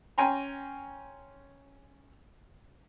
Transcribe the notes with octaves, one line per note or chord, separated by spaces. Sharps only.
C#4 G5 G#5 A#5 C6